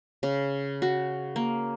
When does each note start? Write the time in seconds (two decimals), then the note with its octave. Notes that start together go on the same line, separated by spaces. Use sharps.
0.23 C#3
0.82 F#4
1.36 A#3